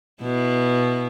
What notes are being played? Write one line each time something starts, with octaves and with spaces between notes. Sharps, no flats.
B2 E4